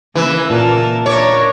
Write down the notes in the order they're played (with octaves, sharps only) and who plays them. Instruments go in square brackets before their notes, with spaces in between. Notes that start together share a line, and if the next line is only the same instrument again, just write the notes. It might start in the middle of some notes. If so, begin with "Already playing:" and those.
[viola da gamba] C#3 A#3 [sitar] E3 [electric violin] B4 E5
[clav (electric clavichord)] A#2 [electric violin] A#4 A5
[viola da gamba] D4 E4 A#4 [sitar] C#5 [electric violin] C#6 D6